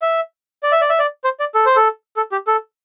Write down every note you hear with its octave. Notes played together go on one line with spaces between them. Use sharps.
E5
D5
E5
D5
E5
D5
C5
D5
A4
C5
A4
A4
G4
A4